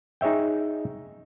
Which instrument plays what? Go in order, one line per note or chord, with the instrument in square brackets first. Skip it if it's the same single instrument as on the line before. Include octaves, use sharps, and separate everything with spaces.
[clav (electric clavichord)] D#4 G#4 C#5 E5 G5